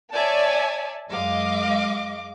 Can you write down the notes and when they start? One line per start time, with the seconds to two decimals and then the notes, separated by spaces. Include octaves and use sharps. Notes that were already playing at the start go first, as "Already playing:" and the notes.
0.12 C#5 D5 E5 G#5 A5
1.10 F#2 G#3 D#5 F5 D6